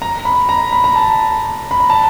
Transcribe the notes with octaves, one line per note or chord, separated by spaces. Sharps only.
A#5
B5
A#5
B5
A#5
A5
B5
A#5
A5